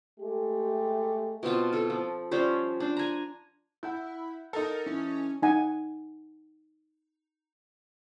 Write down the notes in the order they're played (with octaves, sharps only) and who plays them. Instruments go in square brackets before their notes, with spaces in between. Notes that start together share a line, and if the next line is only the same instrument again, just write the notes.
[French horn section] G#3 A3 G4
[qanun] B2 C4 F4 A5
F4 A4
F3
F3 G3 C#4 C5
D4 C5
G#5 A#5
[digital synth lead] E4 [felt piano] F#5 G6
[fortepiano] D#4 A4 [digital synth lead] A#4
[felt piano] E3 [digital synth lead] C#4
[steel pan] D#4 F#5 G#5